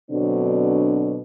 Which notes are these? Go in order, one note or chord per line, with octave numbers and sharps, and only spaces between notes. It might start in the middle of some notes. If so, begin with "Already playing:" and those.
B2 D3 F#3 C4 D4